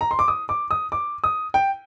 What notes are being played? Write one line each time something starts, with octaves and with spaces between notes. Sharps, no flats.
A#5
C6
D6
D#6
D6
D#6
D6
D#6
G5